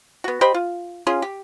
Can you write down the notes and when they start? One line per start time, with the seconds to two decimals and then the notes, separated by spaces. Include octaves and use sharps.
0.24 B3 F#4
0.41 G4 C5 D#5 B5
0.54 F4
1.07 C#4 F4 G#4
1.22 G4